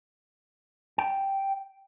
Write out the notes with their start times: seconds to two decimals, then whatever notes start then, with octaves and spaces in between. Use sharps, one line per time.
0.98 G5